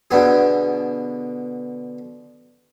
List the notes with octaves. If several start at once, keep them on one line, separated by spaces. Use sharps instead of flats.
B2 D3 B3 G#4